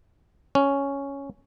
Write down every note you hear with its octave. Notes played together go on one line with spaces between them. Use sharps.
C#4